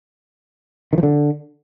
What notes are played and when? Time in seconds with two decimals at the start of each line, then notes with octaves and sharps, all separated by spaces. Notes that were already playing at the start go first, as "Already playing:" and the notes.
0.93 D#3
0.98 F3
1.03 D3